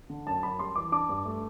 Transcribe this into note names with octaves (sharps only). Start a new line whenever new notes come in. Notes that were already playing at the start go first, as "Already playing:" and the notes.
D3
F#2 A5
F#2 B5
G3 C6
E3 D6
D4 D6
G2
A3